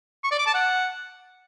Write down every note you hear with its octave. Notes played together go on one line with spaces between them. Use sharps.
C#6
D5
D6
A5
F#5